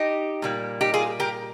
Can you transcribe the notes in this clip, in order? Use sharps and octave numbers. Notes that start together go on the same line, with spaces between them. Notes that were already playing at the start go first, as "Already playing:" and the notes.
Already playing: D#4 G4
A#2 G3 A#3
D#4 G4
F4 G#4
G4 A#4